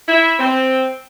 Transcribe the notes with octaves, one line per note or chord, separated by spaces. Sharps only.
E4
C4